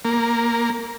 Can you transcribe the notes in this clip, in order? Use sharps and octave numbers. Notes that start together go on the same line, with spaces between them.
A#3